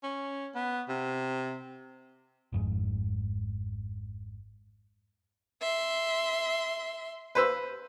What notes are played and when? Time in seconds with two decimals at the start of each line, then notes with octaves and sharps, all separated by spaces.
0.03 C#4
0.55 B3
0.89 C3
2.52 G#1 F2 G#2
5.61 E5 C6
7.35 B4 C5 E6